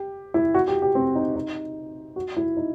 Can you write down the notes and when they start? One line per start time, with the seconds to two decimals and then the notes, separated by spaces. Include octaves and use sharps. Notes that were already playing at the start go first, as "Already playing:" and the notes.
Already playing: G4
0.34 E4
0.54 F#4
0.68 G4
0.82 G4
0.95 C4
1.15 D#4
1.36 D#4
2.16 F#4
2.37 E4
2.57 D#4